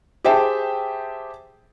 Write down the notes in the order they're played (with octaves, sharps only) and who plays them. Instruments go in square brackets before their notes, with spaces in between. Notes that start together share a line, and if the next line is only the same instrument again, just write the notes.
[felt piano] G4 G#4 C5 E5 G5 A5